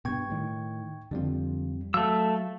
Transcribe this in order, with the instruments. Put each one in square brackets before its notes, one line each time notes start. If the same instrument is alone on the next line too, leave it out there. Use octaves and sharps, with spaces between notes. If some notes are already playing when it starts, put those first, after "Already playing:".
[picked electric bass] G2 B2 [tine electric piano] G5 C#6 G#6
[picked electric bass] A2 D#3
[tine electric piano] F2 G3 C4 [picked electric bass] D3 F3
[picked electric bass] F#3 [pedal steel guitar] A3 E6 [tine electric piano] F5